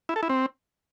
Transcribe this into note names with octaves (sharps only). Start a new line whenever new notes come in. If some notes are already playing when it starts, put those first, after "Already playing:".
E4
A4
E4
C4